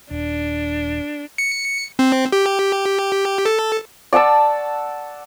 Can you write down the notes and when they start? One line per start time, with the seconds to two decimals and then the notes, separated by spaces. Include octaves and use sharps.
0.11 D#1 D4
1.38 C#7
1.99 C4
2.32 G4
3.45 A4
4.13 D5 F#5 A5 E6